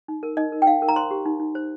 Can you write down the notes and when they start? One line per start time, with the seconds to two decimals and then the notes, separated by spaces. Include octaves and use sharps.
0.08 D#4
0.23 A#4
0.37 D#4 D#5
0.52 A#4
0.62 G5
0.67 D#4 F5
0.82 A#4
0.88 A#5
0.96 C5 C6
1.11 G4
1.26 D#4
1.40 D#4
1.55 C5